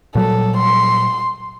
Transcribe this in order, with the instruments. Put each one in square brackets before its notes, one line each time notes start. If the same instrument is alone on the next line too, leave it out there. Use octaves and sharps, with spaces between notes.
[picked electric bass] A#2 F#3 G3 [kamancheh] A4
[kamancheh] C6